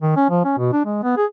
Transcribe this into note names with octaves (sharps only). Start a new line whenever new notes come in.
D#3
C#4
F3
C#4
B2
D4
G#3
B3
G#4